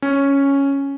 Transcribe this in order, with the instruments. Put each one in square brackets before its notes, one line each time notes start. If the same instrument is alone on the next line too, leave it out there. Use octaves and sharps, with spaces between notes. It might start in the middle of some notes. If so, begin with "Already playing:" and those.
[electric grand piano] C#4